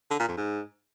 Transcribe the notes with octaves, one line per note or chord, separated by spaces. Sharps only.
D3
A#2
F2
G#2